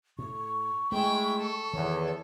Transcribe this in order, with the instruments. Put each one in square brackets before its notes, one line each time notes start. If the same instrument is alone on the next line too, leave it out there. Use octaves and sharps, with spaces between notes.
[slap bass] A2 [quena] C#6
[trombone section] G#3 [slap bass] A3 [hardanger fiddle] E4 G5
[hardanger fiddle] A4
[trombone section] E2 [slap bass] D#3 [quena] C#5